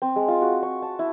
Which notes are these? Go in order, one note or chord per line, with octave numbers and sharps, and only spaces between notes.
C4
G#3
F4
F#4
C#6
A5
E4